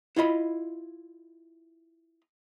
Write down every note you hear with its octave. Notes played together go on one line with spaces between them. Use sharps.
E4 F4 D#5 B5